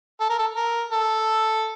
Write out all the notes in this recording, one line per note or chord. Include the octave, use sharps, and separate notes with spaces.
A4
A#4
A4
A#4
A4